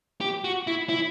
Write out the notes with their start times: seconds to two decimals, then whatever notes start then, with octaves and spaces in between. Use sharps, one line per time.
0.21 G4
0.44 F#4
0.67 E4
0.89 E4